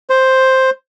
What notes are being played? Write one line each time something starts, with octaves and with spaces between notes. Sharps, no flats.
C5